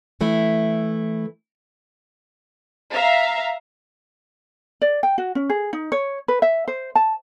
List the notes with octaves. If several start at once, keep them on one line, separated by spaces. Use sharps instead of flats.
E3 A3 E4
E5 F5 A#5
D5
G5
F#4
C#4
G#4
D#4
C#5
B4
E5
C5
A5